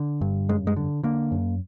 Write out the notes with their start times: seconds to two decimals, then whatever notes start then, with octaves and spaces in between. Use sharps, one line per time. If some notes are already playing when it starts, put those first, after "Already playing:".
Already playing: D3
0.21 G2
0.49 F#2 G#3
0.67 G#3
0.76 D3
1.03 D3 A#3
1.32 F#2